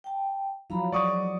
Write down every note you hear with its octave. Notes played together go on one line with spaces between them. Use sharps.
G5 A5
F3 F#3 E4 F5 A#5 B5
F#3 G#3 D5 C#6 D#6